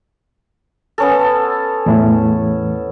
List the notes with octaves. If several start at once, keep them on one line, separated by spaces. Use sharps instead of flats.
B3 C#4 A4
E2 A2 E3